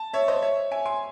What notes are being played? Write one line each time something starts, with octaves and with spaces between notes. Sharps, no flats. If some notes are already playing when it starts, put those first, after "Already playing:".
Already playing: A5
C#5 E5
C5 D#5
C#5 E5
E5 G#5
G#5 C6